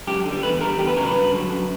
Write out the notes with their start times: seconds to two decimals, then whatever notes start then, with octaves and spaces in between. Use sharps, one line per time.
0.07 F#2 G4
0.25 D3 G3
0.43 E2 B4
0.60 D3 A#4
0.65 G3
0.78 E2 G4
0.87 B4
0.97 C#3 A#4
1.02 F#3 B4
1.15 G2
1.33 D3 F#3
1.50 F#2